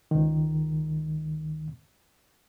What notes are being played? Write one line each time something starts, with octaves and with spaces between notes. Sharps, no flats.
C#2 D#3